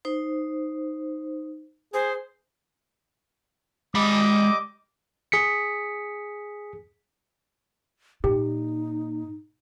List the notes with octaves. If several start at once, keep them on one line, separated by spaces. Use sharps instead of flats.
D#4 C5
G#4 C5
G3 G#3 D#5 B5 D6
G#4 B6 C#7
A#2 D#4 G4